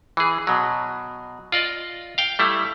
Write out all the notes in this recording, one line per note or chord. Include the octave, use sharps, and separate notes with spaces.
E3 G#4
B2 F#3
F4 D5 D#5
F5 G5
G3 A3 E4